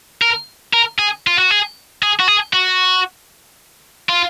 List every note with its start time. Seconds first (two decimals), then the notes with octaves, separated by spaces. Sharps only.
0.22 A#4
0.73 A#4
0.99 G#4
1.27 F4
1.38 F#4
1.51 G#4
2.03 G#4
2.20 F#4
2.28 G#4
2.53 F#4
4.09 F4